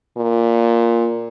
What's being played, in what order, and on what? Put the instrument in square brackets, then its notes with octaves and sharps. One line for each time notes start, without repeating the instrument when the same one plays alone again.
[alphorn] A#2